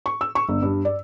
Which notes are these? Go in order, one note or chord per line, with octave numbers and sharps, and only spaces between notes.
C#6
E6
C#6
G1
G2
D5